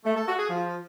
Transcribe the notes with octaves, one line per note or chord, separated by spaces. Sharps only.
A3
A4
F#4
G#4
F3